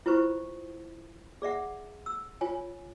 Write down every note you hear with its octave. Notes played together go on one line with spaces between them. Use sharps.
E4 F4 B4 C5 C#6
G#4 D5 E5 F#5
E6
F4 C#5 G#5